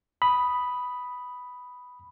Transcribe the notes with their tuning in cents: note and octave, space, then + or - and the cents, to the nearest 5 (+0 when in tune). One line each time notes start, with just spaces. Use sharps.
B5 +0 D#6 +0